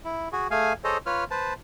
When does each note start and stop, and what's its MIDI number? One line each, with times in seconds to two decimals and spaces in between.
0.05 0.29 64
0.32 0.48 66
0.32 0.48 68
0.51 0.73 57
0.51 0.73 68
0.51 0.73 77
0.51 0.73 80
0.84 0.98 68
0.84 0.98 69
0.84 0.98 72
0.84 0.98 73
0.84 0.98 75
1.06 1.24 65
1.06 1.24 71
1.06 1.24 73
1.06 1.24 89
1.31 1.54 71
1.31 1.54 72
1.31 1.54 81